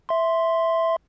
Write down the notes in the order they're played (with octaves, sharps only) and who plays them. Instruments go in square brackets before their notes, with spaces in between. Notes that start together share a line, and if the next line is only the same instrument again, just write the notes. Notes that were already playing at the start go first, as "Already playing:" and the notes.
[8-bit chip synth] E5 C6